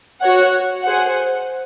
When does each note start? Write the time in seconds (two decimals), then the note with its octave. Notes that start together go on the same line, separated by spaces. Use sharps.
0.21 F#4 C#5 F#5
0.84 G#4 C5 F#5